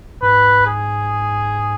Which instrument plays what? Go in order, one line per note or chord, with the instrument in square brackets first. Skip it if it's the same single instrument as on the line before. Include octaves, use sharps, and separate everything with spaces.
[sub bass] G#2 [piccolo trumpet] B4
[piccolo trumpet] G#4